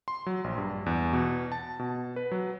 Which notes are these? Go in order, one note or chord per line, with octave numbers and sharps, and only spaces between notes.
C6
F#3
A#1
G2
E2
B2
A5
B2
B4
F#3